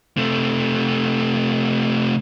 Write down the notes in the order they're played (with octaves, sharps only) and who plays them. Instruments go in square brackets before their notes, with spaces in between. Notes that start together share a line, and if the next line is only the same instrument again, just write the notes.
[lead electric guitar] C3 A3